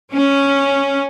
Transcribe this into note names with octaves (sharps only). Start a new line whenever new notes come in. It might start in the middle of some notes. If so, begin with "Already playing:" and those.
C#4